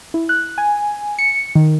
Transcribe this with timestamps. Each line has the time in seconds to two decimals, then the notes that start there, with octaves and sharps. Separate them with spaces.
0.14 E4
0.29 F#6
0.58 G#5
1.19 C#7
1.55 D#3